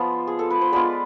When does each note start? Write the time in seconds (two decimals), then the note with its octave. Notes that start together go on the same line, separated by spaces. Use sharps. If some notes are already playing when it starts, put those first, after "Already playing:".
Already playing: F3 G#3 B3 F4 D5
0.27 G#4
0.39 A4
0.50 B4
0.61 C5
0.72 G#3 B3 F4 B4 D5